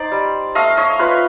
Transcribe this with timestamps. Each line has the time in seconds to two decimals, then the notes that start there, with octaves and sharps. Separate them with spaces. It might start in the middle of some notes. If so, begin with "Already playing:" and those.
Already playing: D#4 C5 D5
0.12 G3
0.55 A3 D#5 F5
0.77 C#5 D#5
0.99 F4 B4 C#5